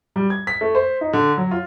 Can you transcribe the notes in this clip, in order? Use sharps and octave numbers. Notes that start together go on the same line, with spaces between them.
G3
G#6
B6
A3
C5
D#4
D3
F#3
F4